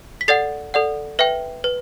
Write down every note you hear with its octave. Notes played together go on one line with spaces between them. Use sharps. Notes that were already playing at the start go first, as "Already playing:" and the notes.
B6
A4 D5 F#5 A6 C7
A4 D5 F#5
B4 E5 G5
B4